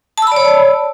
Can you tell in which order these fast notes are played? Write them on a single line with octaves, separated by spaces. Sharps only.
A5 E6 B5 D5 C#5